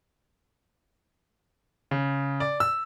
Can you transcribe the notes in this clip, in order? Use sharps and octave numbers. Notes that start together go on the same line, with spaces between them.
C#3
D5
E6